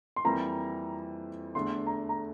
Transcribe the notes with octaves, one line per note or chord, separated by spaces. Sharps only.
C6
F2 E3 G3 A#3 A#5
E2 D3 A3 D4 C6
A#5
A#5